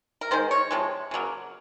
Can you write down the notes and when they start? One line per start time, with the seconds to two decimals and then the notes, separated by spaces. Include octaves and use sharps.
0.21 A#4
0.31 D#3 G#3 C5
0.51 C#5
0.71 C3 F3 G#3
1.11 C#3 F#3 A#3